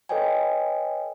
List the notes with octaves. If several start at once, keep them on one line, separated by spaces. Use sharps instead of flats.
A4 B4 C#5 D#5 G5 G#5